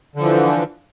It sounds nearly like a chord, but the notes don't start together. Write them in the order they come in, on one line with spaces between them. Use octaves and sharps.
D3 F3 E3